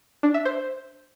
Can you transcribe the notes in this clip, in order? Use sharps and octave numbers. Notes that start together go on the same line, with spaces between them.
D4
E5
C5